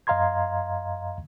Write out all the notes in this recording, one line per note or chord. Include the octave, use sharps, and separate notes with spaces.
F#2 D#5 F5 A#5 C6 G#6